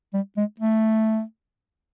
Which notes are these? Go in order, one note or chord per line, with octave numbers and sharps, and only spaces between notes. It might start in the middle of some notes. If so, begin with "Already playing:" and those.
G3
G#3
A3